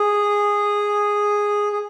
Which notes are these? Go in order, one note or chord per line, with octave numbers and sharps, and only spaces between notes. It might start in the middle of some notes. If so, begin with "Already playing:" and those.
Already playing: G#4
G#4